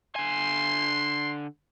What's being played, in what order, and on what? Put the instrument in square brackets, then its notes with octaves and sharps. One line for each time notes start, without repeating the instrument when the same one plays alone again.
[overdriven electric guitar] D3 G#5 [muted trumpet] C6